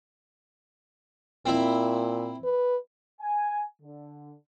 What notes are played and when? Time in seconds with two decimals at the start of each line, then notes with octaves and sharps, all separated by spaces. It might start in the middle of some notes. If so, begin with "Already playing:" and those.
1.46 A#2 C4 E4
2.44 B4
3.21 G#5
3.82 D3